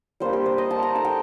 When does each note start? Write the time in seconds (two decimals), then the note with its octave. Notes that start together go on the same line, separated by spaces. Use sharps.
0.20 G3 A#3 D4 C5
0.33 G4
0.46 C5
0.58 D#5
0.71 A5
0.83 A#5
0.95 A3 D#4 A5
1.05 G5